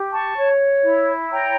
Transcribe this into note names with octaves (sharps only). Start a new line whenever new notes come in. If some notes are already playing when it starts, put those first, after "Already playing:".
Already playing: G4
A5 C#6
C#5
E4
C#5 G5 A#5